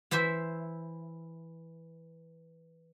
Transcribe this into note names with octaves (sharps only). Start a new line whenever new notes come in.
E3 E4 C5 E5